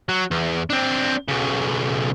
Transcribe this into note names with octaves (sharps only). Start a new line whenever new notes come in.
F#3
E2
C4 D4
B1 C#3